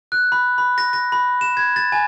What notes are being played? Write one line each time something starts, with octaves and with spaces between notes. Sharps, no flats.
F#6
B5
B5
A#6
A#6
B5
E7
G#6
A6
G#5